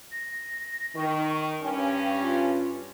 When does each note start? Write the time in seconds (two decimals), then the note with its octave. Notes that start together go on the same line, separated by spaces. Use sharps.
0.12 A#6
0.96 D#3 C#6
1.63 G2 C#4 G5
2.22 F4